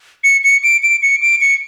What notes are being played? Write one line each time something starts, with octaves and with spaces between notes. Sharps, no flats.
C#7
C#7
D7
D7
C#7
D7
C#7